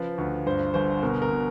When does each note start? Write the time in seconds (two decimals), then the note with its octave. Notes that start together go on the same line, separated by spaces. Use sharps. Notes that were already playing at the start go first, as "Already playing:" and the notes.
Already playing: C#3 F3 B4
0.18 D2
0.46 G2 C5
0.74 G1 C5
1.03 B2 A#4
1.22 A#4
1.30 B2